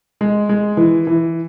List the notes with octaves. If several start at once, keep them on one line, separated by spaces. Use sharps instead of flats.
G#3
G#3
E3
E3